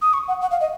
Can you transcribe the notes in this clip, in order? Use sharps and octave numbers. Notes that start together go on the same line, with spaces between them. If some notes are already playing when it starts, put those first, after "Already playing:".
D#6
C#6
F#5
F#5
F5
D#5